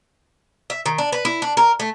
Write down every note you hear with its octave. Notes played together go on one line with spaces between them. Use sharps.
E5
D#3
D4
B4
E4
D4
A#4
A3